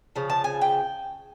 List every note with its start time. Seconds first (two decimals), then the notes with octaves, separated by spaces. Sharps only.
0.16 C#3 F3
0.30 A5
0.44 G#5
0.61 G5